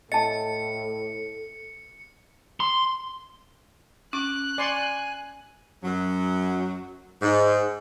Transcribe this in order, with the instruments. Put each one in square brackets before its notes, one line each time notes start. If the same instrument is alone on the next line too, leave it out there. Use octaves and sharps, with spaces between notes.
[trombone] A2 [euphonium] A4 [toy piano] D#5 A5 [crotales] C#7
[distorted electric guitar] C6
[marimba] C#4 [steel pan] D6 [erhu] F#6
[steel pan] D5 C6 C#6 [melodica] G#5
[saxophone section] F#2 F#3
G#2